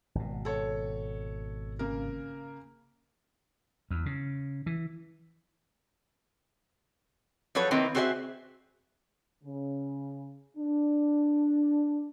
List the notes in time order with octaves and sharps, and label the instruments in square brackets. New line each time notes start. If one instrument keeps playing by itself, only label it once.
[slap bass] G#1 B2
[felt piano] A4 C#5
C#3 A#3 A#4
[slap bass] E2
C#3
E3
[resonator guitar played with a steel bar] F3 F#3 A4 B4 C#5
D#3 A#3 C4 E4 B4
C4 F#4 G#4 C5 C#5 E5
[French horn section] C#3
D4